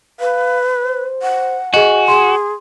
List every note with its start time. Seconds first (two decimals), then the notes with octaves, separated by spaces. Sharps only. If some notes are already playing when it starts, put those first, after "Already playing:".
0.20 B4 F5
0.82 C5
1.22 F#5
1.74 F#4 G#4 D#5 G#5
2.08 G#4 C6